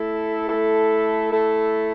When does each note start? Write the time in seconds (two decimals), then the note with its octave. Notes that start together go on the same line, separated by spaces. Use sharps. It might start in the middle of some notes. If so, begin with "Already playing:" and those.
Already playing: A3 E4 A4
0.47 A3 E4 A4
1.30 A3 E4 A4